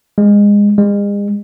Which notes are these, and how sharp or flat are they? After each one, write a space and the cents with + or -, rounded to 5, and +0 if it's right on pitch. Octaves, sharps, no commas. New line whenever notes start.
G#3 -20
G#3 -40